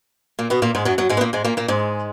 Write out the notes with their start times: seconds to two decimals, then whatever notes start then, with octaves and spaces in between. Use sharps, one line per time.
0.39 A#2 A#3
0.50 B2 B3
0.62 A#2 A#3
0.75 G#2 G#3
0.85 F#2 F#3
0.98 F#2 F#3
1.09 G#2 G#3
1.17 B3
1.21 A#2 A#3
1.33 G#2 G#3
1.44 A#2 A#3
1.57 A#2 A#3
1.68 G#2 G#3